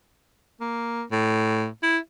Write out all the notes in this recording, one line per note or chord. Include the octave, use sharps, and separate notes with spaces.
A#3
A2
E4